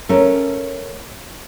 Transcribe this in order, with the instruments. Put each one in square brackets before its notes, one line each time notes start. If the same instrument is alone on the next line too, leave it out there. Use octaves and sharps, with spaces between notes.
[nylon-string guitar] A3 C#4 A#4